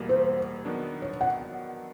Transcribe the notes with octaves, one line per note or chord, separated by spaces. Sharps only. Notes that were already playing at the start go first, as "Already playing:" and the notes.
Already playing: E2 B2 G3 A#3
C5
D#3 F#3 B3 D4
C#5
F#5